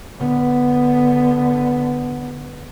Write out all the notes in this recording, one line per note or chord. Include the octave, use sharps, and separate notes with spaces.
D3 B3